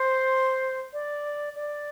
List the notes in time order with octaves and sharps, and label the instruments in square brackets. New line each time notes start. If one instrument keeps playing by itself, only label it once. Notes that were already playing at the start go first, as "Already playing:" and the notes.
Already playing: [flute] C5
D5
D5